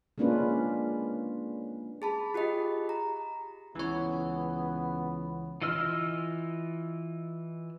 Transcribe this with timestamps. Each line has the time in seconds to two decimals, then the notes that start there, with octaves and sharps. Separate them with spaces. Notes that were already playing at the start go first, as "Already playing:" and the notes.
0.18 G#3 A#3 C#4 D4 F4 B4
2.02 G#4 A5 B5
2.34 F4 G4 G#4 D#5 B5
2.89 A#5
3.75 C#2 E3 B3 C#5
5.62 E3 F4 D#5 E6 F6